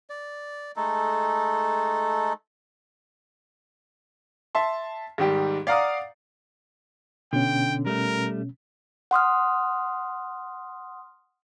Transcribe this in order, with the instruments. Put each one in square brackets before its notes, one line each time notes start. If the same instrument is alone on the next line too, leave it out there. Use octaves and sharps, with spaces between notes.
[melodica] D5
G#3 A3 D#4 A4
[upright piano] E5 A5 C6
G#2 D#3 G3 G4
D5 F5 F#5 A#5 D6 D#6
[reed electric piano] B2 C#4 [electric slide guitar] D3 [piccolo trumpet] G5
[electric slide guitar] G3 A3 [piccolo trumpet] A#4
[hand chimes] F#5 C6 D#6 F6